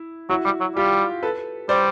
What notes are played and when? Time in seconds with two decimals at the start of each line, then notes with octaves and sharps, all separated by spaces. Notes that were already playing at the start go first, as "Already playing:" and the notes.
Already playing: E4
0.29 F#3 E4 F#4
0.45 G3
0.60 F#3
0.76 G3 F4 G4
1.23 A4 B4
1.69 G3 C5 D5